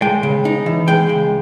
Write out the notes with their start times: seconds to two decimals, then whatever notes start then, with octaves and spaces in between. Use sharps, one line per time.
0.02 G#3 G5
0.23 C#3
0.45 D#4
0.66 E3
0.88 G#3 G5
1.09 C#2